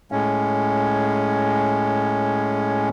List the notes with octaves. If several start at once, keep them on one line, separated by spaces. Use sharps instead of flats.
A2 G#3 C#4